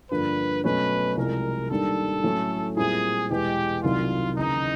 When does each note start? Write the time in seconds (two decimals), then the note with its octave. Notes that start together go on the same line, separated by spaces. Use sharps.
0.11 G2 D3 F3 A#3 D4 B4
0.63 B2 F#3 A3 C#4 B4
1.17 C2 C3 F3 G#3 A#4
1.70 G#2 D#3 G3 A#3 D4 A4
2.23 A2 F#3 A3 C#4 E4
2.76 A#2 G3 C4 E4 G#4
3.30 E2 B2 G#3 G4
3.83 C2 C3 D#3 F#3 F4
4.37 D#2 C#3 E3 D#4